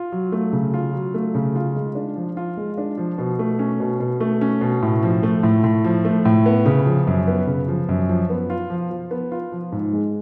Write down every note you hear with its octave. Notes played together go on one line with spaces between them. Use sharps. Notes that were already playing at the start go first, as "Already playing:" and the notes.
Already playing: F4
F#3
A3
C#3
F4
F#3
A3
C#3
F4
G#3
D4
F3
F4
G#3
D4
F3
B2
A3
C#4
B2
B2
A3
C#4
B2
A2
F3
A3
A2
A2
F3
A3
A2
B3
C#3
F3
F#2
B3
C#3
F3
F#2
F3
B3
F4
F3
F3
B3
F4
F3
G#2
G#3